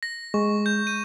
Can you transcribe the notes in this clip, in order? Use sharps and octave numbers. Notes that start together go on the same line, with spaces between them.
A#6
G#3 C#6
G6
D#7